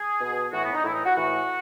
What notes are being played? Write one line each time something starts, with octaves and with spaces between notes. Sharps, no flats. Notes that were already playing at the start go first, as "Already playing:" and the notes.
Already playing: G#4
B2
A2 E3 F#4
B3
D#4
A2 E3 E4
D#4
F#4
A2 E3 F#4